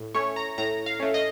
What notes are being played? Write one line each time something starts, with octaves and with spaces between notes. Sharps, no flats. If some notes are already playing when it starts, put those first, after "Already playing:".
Already playing: A2
A3 C#4 C#5
A#5
A2 A#5
F5
A3 C#4
D#5